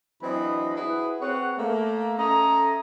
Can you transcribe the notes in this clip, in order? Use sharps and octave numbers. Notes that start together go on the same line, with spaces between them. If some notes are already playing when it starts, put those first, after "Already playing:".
E3 F#3 C4 D4 D#5 B5
E4 F#4 G#4 B4
C4 G#4 B4 C#5 F#5
A3 A#3
C#4 A4 D#5 E5 A#5